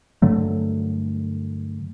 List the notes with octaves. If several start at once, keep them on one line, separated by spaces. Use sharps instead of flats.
G2 D3 F#3 A3